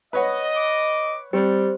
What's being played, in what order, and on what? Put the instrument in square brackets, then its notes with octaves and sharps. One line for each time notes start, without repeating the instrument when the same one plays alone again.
[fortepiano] B4 C#5 F#5 [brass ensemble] D#5
[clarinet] D6
[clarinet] G3 [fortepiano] C4 [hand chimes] G4 C5